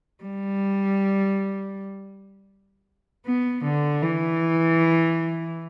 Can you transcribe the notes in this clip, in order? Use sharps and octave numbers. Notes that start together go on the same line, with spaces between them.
G3
B3
D3
E3